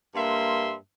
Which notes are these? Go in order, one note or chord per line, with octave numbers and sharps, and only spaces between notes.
G2 A#3 E5 C6